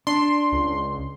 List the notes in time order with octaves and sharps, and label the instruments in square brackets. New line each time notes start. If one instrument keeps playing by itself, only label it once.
[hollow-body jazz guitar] D4 [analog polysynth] C6
[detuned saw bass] C#2